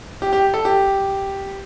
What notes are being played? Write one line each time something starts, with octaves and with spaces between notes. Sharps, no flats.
G4
G4
A4
G4